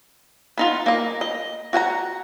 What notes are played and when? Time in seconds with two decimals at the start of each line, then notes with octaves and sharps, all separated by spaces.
0.58 B3 D#4 F4
0.86 A#3 D#5
1.21 D#5
1.73 F#4 F#5 G#5 A#5